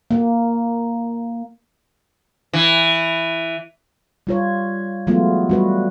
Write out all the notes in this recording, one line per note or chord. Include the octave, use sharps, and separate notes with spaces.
A#3
E3
G3 F4 C#5
E3 F#3 G#3 A3 B3 F4
G3 F#4 B4